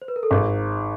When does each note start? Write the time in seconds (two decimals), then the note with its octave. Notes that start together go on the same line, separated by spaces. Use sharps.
0.02 C5
0.08 B4
0.16 A#4
0.23 A4
0.30 G#1 G#4